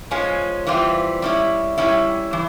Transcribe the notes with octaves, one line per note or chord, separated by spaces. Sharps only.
F3 G#3 C#4 F4
E3 G3 C4 F4
G3 C#4 E4
G3 C#4 E4
E3